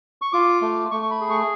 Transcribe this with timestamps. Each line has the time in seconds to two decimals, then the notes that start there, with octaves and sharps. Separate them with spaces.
0.22 C#6
0.33 F4 D6
0.62 A3
0.91 A3 C#6
1.03 C#6
1.10 B5
1.21 G#4
1.30 C#6